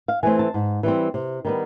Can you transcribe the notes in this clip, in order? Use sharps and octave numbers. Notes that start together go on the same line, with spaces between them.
F5
E3 A3 C4 G#5
A5
G#2
E3 G3 C4
C3
D#3 G3 B3